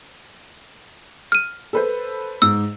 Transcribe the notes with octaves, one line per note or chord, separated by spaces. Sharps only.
F6 D#7
A4 B4 C5
G#2 E6